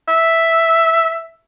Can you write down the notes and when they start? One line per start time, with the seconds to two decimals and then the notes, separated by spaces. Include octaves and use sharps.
0.08 E5